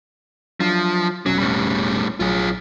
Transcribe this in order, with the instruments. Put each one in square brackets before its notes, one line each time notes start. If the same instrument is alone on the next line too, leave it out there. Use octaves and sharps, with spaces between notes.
[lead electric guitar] F3 [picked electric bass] F#3 D4
[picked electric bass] F1 B2 C#4 [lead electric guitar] F#3
[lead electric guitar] A2 G3
[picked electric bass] A#1 F#3 [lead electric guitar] F4 G#4